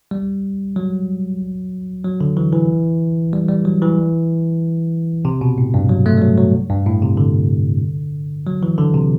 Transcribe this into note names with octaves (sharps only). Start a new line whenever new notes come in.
G3
F#3
F#3
D3
E3
E3
G3
G3
F#3
E3
C3
B2
A2
G2
F#3
A3
G3
F#3
F#3
G2
A2
C3
D3
F#3
E3
D3
C3